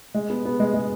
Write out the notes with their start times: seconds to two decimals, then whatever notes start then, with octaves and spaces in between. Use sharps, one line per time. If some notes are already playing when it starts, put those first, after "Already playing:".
0.14 G#3
0.30 B3
0.45 B3
0.60 G#3
0.74 G#3